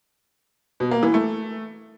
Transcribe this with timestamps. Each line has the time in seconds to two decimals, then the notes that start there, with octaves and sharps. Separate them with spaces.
0.80 B2
0.91 A#3
1.03 E3
1.14 A3